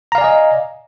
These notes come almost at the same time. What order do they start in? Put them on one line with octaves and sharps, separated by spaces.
A#5 F5 D5 G#5 D#5